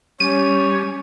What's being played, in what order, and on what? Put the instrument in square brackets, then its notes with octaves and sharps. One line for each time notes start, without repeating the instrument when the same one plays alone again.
[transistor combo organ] G3 [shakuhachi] C#4 [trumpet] C#5 [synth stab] D#7